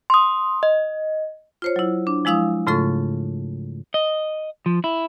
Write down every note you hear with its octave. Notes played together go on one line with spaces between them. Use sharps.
C6 D#6
D#5
F4 C5 C#5
F#3 E4
D4
F3 G#3 E4 F5 D#6
G#2 C#3 A3 F4 A4 C#6
D#5
F3
E4